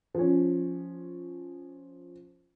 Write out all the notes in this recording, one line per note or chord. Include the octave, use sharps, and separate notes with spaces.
F3 C#4